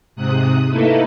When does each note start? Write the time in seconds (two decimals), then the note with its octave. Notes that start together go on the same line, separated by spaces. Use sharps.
0.16 G#2 C3 D#6 F#6
0.70 A3 A#3 D#4 E4 A4 B4